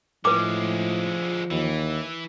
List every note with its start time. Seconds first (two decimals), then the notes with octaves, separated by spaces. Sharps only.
0.25 A2 D3 F3 G#3 B4 D6
1.51 D#2 E3